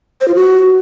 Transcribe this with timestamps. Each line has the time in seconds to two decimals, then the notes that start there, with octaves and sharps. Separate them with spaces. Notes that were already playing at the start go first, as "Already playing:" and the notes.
0.21 C5
0.28 F4
0.35 F#4